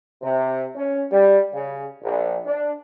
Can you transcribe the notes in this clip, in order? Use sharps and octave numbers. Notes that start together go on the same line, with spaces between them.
C3
C#4
G3
C#3
A#1
D4